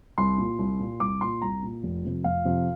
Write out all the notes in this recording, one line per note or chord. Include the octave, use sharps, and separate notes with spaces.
C2 C6
A#2
C2
A#2
C2 D6
A#2 C6
C2 A#5
A#2
F1
F2 C3
F1 F5
F2 C3